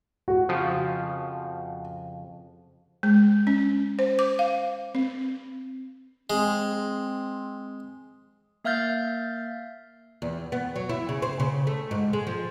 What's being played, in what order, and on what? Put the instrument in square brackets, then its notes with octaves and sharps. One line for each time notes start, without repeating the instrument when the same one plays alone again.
[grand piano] F#4
[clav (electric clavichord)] F2 C#3 F3
[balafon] G#3
C#4
C5
D6
F5
C4
[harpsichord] G#3 [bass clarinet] C4
[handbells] A#3 E5 F5 F6 G6 A6
[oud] E2
B3
F#3
E4
C#3
C5
C#3
A3
G#2
G#3
F3